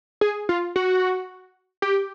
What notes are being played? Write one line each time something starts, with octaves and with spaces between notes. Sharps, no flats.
G#4
F4
F#4
G4